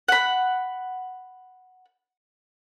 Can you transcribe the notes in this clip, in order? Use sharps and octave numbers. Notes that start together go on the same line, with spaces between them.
F#5 B5